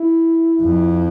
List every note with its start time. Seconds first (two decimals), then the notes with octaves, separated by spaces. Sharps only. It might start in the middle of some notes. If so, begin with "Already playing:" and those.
Already playing: E4
0.61 F2